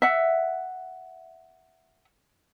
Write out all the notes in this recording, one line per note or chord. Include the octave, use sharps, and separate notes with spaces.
E5 F#5